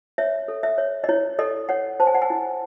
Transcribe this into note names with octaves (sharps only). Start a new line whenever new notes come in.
C#5 E5
A4
E5
C#5
D#5
E4 C#5
A4 D#5
C#5 F#5
C5 A5
G#5
F#5
G#5
E4